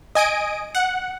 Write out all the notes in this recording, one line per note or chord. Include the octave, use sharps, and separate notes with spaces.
D#5 G#5 D#6 D7
F#5